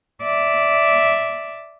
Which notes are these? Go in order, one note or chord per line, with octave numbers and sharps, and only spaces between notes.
D5 E5